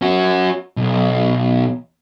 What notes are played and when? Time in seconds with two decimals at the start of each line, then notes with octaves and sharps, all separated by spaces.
0.02 C#4 F#4
0.77 B1